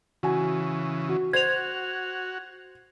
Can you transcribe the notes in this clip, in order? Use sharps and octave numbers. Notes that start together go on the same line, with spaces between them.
C#3 E3 F#4 G#5
F#4
F#4 C5 G#6 F7